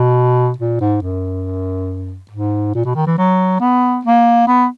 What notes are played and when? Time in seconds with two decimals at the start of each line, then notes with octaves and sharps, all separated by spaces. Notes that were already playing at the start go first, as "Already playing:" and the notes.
Already playing: B2
0.58 A#2
0.80 G#2
1.02 F#2
2.31 G#2
2.75 A#2
2.85 B2
2.96 D#3
3.07 E3
3.18 F#3
3.61 B3
4.05 A#3
4.48 B3